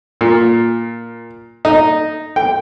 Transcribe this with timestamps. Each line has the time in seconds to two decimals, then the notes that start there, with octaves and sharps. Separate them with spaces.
0.21 A#2
1.65 D#4
2.36 G5